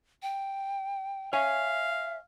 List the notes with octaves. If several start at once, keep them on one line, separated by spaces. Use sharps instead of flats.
G5
C#5 E5 F5 G#5